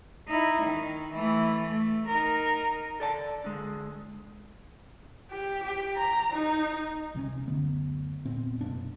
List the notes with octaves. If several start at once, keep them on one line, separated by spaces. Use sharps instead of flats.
D#4 E4
D#3
E3 A3
A3
D#4 A#4
A4 D5 A5
D3 G#3
G4
G4
A#5
D#4
C2 C3 G#3 C#4
F#1 D2 D3 B3
E1 A#2 B3 C4
F#2 B2 A#3 D4